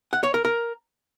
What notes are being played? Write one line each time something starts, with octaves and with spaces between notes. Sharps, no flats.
F#5
C#5
A#4
A#4